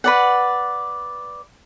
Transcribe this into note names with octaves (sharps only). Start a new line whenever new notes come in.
B4 D5 F#5